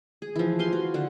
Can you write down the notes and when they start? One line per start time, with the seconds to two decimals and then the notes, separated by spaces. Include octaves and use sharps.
0.22 G#4
0.36 E3 F3
0.59 G4 F5 G#5 C6
0.73 F#4
0.94 D3 F#5